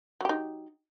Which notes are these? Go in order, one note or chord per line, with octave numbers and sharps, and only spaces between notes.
F#3 D#4 G4